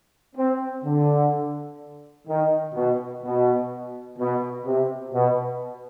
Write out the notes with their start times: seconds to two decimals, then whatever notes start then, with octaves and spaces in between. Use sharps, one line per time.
0.36 C4
0.85 D3
2.28 D#3
2.75 B2
3.23 B2
4.19 B2
4.65 C3
5.13 B2